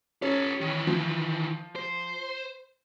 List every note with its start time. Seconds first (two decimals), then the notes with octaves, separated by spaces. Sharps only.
0.22 C#4 G4 A4
0.61 D#3 E3
0.87 F3
1.76 C5